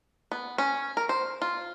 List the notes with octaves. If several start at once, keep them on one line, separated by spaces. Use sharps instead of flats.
B3
C#4
A#4
C5
F4